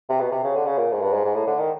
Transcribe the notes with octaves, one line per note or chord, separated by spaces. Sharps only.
C3
B2
C3
C#3
D3
C#3
A#2
G#2
G2
G#2
G#2
A2
D3
D#3